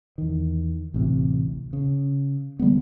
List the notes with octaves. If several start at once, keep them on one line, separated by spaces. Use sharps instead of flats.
E2 D#3
A1 D2 C3
C#3
D3 G3 G#3 B3